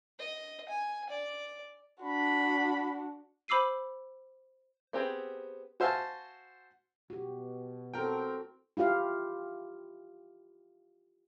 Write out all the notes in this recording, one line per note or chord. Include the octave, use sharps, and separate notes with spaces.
D#5
G#5
D5
D4 F#4 B5
C5 B5 D6 E6 C7 D#7
B3 C4 G4 G#4
F#4 C5 E5 F5 G#5 A5
B2 F#4 G4
C4 E4 F#4 A4 A#4 G5
E4 F4 G4 F5